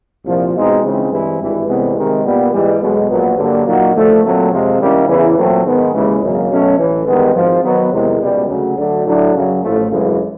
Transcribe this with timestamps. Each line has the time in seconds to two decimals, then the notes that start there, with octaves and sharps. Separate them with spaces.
0.25 C2 A#2 F3
0.54 B2 G#3 C4 D#4
0.82 C#2 C#3 E3 G#3 C4
1.10 G2 E3 G#3 C4 E4
1.39 G#1 G2 E3
1.67 C2 C3 E3 G#3 B3
1.95 C3 D#3 G#3
2.24 A#2 G3 B3
2.52 G#2 E3 G3
2.81 B1 B2 G#3
3.09 A#1 A#2 F#3 B3
3.38 G2 D3 F#3 A#3
3.66 A#2 F#3 A#3 D#4 F#4
3.94 D3 F3 A3
4.23 A#2 F#3 A3 C4
4.51 F2 C3 F3 G#3 C4
4.79 D#3 G3 A#3 C#4 E4
5.07 E2 C#3 E3
5.36 A#2 F#3 A3 C4
5.64 G#2 D#3 G#3 B3
5.93 D#2 C#3 E3 G#3
6.22 G#1 F#2 C#3 F#3 A#3
6.50 B2 F#3 A3 C#4
6.77 A1 A2 E3
7.06 G2 D#3 G#3 B3
7.34 G#1 G#2 F3
7.62 D#3 F#3 B3
7.92 E2 C3 D#3 G#3
8.20 C#2 B2 G3
8.48 D2 C#3 F#3
8.76 D2 D3 F#3 A3 D4
9.05 A2 F#3 A3 D4
9.33 F#2 C#3 F#3
9.62 A1 A2 F3 A3
9.90 G#1 F#2 C#3 E3 G#3